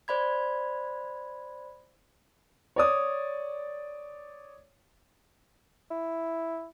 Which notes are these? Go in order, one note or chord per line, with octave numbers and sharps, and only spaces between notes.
C5 D5 B5 G#6
C#5 D5 D#6
E4